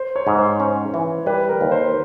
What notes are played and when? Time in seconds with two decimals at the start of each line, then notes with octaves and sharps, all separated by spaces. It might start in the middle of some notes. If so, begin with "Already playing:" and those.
Already playing: C5
0.16 C#5
0.27 G#2
0.38 C5
0.60 C#4
0.94 E3
1.26 G3 B4
1.49 A#4
1.61 D#2
1.71 C5